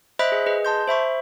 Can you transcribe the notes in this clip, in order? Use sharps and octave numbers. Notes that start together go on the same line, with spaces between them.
C5 D#5 E5 B5 F#6 B6
G#4
G#4 B4 D#5
A5 C6 G6
C5 E5 B5 C#6